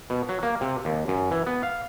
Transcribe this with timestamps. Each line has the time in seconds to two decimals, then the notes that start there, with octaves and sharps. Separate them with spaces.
0.10 B2
0.29 F#3
0.43 A#3
0.61 C3
0.85 D#2
1.08 F#2
1.31 E3
1.47 B3
1.63 F5